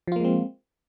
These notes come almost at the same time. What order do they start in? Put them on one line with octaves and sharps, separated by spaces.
F3 F4 A#3 G#3 C4